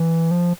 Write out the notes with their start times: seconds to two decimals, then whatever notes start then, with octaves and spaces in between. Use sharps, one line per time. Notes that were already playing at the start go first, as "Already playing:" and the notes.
Already playing: E3
0.31 F3